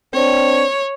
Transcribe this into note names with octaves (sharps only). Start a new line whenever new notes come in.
C4 D4 C#5